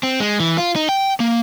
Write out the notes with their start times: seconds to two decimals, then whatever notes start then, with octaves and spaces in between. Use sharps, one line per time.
0.03 C4
0.20 G#3
0.40 E3
0.58 F4
0.76 D#4
0.89 G5
1.20 A#3